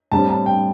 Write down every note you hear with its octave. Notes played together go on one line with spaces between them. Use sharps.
A2 G3 C4 A5
A5
G5